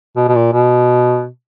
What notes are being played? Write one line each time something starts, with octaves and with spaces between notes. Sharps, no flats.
B2
B2
A#2
B2